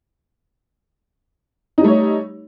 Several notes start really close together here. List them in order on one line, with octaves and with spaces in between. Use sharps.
D#4 G3 A3 C#5